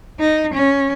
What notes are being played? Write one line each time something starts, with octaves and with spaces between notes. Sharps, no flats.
D#4
C#4